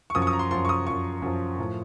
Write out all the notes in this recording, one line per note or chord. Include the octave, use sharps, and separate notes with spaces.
C#6
F#2 F3 D#6
C#6
D#6
A#5
C6
F#2 F3 C6
C#6
D#6
F#2 F3 C#6
F#2 F3
A2 F3